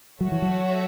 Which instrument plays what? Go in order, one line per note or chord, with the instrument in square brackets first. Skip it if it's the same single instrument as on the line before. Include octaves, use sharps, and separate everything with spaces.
[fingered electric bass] F#3 [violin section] A3 F#4 C#5 E5
[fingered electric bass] E3
F#3